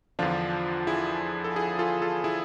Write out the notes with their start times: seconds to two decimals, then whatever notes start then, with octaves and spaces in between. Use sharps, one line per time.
0.19 E2 D3 F3 D4 F4
0.87 E4 G#4
1.44 A4
1.56 E4 G#4
1.79 F4 A4
2.02 F4 A4
2.24 E4 G#4